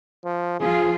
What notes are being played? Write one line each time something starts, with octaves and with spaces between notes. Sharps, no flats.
F3
F3 F4 G#4